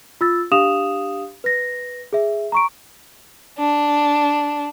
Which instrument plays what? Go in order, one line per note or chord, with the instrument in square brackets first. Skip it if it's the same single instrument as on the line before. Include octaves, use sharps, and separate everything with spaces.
[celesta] F4 E6 A6
D4 G4 F5 D#6 E7 F7
B4 A#6
G#4 E5
A#5 C#6 D7
[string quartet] D4